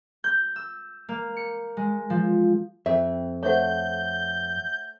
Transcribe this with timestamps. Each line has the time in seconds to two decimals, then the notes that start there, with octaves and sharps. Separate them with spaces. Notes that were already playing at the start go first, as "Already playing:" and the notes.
0.24 G6
0.56 E6
1.09 A#3
1.37 C#7
1.77 G#3
2.10 F3
2.86 F2 C4 E5
3.43 A3 C5 C#5 E5 F#5 G6